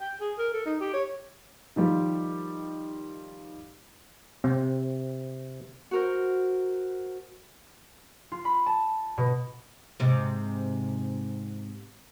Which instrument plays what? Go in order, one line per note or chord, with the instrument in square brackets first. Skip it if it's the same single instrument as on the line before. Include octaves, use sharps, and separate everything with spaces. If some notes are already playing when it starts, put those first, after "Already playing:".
[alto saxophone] G5
G#4
A#4
A4
D#4
G4
C#5
[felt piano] D#3 F3 G3 G4
[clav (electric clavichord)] C3 [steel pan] C4
[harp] F#4 A#4 C5
F4
B5
A5
B2
[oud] G#2 C3